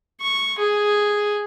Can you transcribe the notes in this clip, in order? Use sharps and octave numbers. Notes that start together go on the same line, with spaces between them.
C#6
G#4